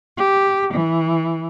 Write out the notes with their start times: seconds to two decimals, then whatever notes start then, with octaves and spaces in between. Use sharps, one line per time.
0.16 G4
0.74 E3